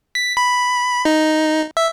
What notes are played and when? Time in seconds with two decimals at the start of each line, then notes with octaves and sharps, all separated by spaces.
0.15 B6
0.37 B5
1.05 D#4
1.77 E5